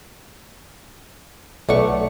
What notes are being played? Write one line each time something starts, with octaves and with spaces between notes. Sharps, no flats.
B1 A3 D5 F#5 C#6